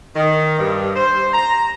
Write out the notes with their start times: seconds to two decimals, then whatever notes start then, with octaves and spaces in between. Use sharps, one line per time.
0.16 D#3
0.59 G2
0.96 C5
1.33 A#5